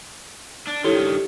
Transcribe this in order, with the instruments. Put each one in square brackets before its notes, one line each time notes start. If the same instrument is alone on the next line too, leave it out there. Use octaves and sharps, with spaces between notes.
[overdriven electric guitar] D4
[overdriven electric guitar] G2 D#3 [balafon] E4 A4 C#5 [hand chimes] G4